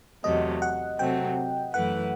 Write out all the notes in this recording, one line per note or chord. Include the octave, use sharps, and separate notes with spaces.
E2 C3 F#3 A3 D#5
F#5
C3 F#3 A3 C4 G5
F#2 E3 A3 E4 B4 F#5